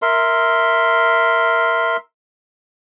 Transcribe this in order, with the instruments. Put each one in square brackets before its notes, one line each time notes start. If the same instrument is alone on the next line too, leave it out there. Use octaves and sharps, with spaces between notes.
[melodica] A#4 E5 C6